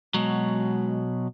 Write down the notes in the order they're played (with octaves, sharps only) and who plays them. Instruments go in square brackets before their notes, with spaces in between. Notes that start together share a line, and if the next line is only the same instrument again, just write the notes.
[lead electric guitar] B2 F#3 [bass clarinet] G#3